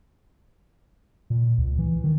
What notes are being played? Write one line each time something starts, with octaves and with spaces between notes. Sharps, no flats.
A#2
C#2
E3
D#3